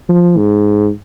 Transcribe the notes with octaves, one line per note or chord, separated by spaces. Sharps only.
F3
G#2